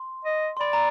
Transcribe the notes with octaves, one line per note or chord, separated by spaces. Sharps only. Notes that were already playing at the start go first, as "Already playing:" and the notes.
Already playing: C6
D#5
C6
D5 B5
A#5